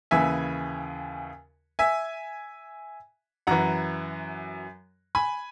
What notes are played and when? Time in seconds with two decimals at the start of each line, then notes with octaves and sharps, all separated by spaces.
0.11 D#2 C#3 E3 E5 G#5
1.79 E5 G#5
3.47 F#2 E3 F#5 A#5
5.15 G#5 B5